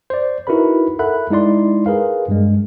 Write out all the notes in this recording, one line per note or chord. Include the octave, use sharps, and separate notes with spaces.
C5 D5
D#4 E4 F#4 A#4 B4 B5
A4 A#4 E5 F#5 B5 F#6
G#3 D#4 E4 D5 C6
G#4 A#4 B4 F5
G2 G3 G#3